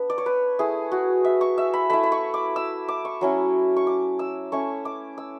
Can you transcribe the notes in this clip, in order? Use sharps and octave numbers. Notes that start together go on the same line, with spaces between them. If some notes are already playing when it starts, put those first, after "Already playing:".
Already playing: B3 D4 B4
D5
C#5
B4
A3 E4 G#4
F#4
E5
C#6
E5
B5
A3 E4 B5
B5
C#6
D6
E6
D6
C#6
F#3 C#4 E4
C#6
D6
E6
A3 C#4 E4 C#6
D6
E6